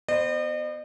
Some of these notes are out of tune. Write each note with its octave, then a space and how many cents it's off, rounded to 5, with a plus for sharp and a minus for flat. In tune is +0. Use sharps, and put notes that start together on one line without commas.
B3 +5 C5 +0 D#5 -40